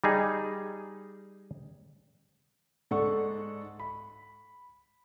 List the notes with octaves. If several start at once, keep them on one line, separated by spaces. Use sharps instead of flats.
G3 D#4 G#4
G#2 A4 D5 F#5 C#6
B5